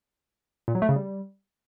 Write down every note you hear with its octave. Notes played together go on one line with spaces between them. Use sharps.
A#2
F#3
A3
C#3
G3